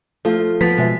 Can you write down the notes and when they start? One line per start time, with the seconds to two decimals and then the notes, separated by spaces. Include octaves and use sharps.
0.25 F3 A3 F4 A4
0.61 F3 B3 B6
0.78 B2 G#3 E5